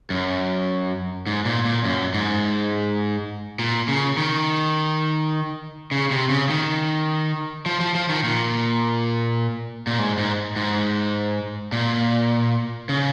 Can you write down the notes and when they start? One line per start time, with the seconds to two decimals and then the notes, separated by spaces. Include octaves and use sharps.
0.10 F#2
1.27 G#2
1.45 A#2
1.65 A#2
1.85 F#2
2.14 G#2
3.59 A#2
3.88 C#3
4.17 D#3
5.91 C#3
6.11 C3
6.30 C#3
6.49 D#3
7.66 F3
7.80 F3
7.95 F3
8.09 D#3
8.24 A#2
9.87 A#2
9.98 G#2
10.18 G#2
10.56 G#2
11.72 A#2
12.89 C#3